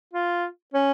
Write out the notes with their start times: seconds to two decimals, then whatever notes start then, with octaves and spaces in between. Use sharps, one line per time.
0.13 F4
0.74 C#4